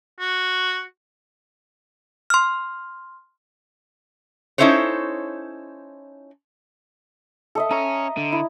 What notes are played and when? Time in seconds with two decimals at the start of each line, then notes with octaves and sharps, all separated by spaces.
0.20 F#4
2.30 C6 F6
4.58 C#4 D#4 E4 A4 C5 C#5
7.55 A4 D#5 E5
7.71 C#4 C#5 A#5
8.17 D3
8.32 E4